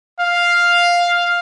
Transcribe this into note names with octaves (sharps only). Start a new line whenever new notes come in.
F5